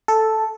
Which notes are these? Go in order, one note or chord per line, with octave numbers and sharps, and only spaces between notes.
A4